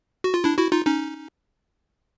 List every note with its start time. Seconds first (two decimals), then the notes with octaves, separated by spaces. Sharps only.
0.24 F#4
0.34 F4
0.44 D4 E4
0.58 E4 F#4
0.72 D#4 F4
0.86 C#4 D#4